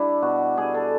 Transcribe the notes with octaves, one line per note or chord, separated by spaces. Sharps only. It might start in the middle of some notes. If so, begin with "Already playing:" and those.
Already playing: G3 D4 E4
B2 F#4
G3 G#4
A4